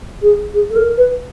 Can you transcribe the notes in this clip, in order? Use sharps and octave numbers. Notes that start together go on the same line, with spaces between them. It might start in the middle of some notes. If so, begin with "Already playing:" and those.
G#4
G#4
A4
A#4
B4